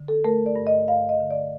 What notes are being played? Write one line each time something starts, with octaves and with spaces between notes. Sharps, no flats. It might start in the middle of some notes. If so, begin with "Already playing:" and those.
Already playing: D3
A4
A3 A#4
D5
G2
D#5
G2 F5
D#5
D3
D5